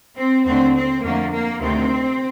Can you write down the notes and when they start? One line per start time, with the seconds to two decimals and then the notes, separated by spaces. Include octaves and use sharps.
0.18 C4
0.46 D#2 D3 A3 C4
0.75 C4
1.03 F2 D3 A3 A#3
1.33 A#3
1.60 D2 C3 D#3 C4